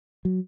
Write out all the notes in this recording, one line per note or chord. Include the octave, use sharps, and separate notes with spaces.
F#3